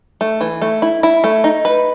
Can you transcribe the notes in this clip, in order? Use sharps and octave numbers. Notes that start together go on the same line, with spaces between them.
A3
E3
A3
E4
E4
A3
D#4
B4